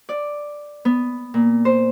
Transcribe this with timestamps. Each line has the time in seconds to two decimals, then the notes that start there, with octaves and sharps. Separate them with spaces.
0.09 D5
0.85 B3
1.34 A#2
1.65 C5